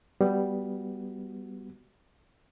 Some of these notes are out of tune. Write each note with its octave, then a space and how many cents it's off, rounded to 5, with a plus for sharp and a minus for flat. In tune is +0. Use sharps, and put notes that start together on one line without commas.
G3 +0 B3 +0 F#4 +0